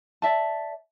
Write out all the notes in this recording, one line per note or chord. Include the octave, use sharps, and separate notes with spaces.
D5 E5 A5